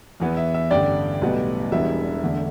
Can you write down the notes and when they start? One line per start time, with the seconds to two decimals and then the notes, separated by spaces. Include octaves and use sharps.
0.20 E2 E3 B3 E4
0.37 E5
0.54 E5
0.71 A1 G2 D3 D5 G5
1.22 B1 A2 G3 B3
1.72 E1 E2 E3 G3 B3 E5
2.23 E2 D3 A3